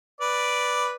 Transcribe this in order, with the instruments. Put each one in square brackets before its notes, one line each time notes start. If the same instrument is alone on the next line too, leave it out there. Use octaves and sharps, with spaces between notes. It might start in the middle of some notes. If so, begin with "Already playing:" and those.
[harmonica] B4 D5